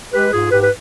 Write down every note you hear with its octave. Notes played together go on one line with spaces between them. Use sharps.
G#3 G4 B4
G#2 F4 G#4
G#2 G4 B4
B4